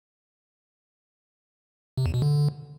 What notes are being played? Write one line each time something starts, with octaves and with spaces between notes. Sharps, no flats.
C3
E2
B2
D3